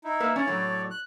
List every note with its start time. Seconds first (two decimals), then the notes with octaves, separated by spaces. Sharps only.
0.04 D#4 E4
0.20 A#3 B4 E5
0.36 C#4 C#5 D5
0.47 A2 F#3
0.91 F#6